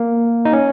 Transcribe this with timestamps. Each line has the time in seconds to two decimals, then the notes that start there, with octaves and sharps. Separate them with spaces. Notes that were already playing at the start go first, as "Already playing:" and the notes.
Already playing: A#3
0.45 D#4
0.53 C#4